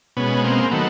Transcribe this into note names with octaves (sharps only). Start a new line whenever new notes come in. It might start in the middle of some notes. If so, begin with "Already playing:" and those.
B2 G#3 B3 C#4
A#3 C4
D#3 F#3 A3 B3